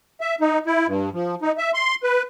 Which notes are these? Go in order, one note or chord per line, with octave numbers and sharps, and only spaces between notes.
E5
D#4
E4
G2
F3
D#4
E5
C6
B4